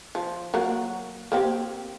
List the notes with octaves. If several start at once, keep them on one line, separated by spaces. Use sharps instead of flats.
F3
F#3 A#3 F#5
A#3 C4 G4